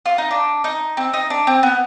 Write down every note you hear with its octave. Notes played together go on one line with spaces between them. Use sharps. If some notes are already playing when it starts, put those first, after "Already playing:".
F4
D#4
D4
D#4
C4
D#4
D4
C4
B3